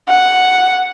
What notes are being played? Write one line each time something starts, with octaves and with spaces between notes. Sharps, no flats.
F#5